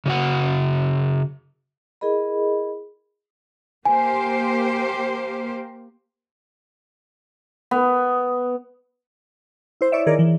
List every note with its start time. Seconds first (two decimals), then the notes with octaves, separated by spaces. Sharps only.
0.06 C#3 F#4 F#5
2.01 E4 G#4 A#4 D#5 B5
3.85 A#3 G4 C5 G#5
7.71 B3
9.81 E4 C5
9.92 E4 C#5 D5 E5
10.06 D#3 G#4 A#4 D5
10.19 E3